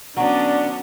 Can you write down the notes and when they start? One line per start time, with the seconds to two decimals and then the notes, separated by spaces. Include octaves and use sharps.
0.17 D3 F#3 B3 C#4 D4 D5